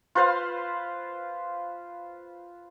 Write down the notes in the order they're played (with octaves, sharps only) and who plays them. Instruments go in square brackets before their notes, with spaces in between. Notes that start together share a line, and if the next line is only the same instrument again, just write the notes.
[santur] F4 B4 C5 F5